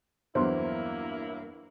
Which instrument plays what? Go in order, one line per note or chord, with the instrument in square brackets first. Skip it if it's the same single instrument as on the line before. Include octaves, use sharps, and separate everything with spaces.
[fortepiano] E2 [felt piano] G2 F#3 [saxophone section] A#3 E4 [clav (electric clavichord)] C5